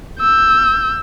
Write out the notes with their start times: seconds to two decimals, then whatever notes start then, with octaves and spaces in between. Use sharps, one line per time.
0.20 E6 G6